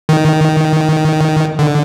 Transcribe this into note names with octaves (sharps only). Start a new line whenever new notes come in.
D#3
D3